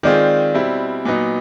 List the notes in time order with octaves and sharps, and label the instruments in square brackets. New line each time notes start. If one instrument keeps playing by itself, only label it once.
[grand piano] D#3 G#3 C4 F4 G#4 [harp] D5
[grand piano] B2 G3 C4 E4
A#2 F#3 B3 D#4